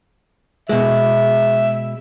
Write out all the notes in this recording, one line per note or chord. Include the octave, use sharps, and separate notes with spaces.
B2 G#3 E5